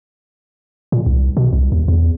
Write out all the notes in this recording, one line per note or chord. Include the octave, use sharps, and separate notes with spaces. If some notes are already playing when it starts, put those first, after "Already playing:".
A#2
C2
B2
C2
D#2
E2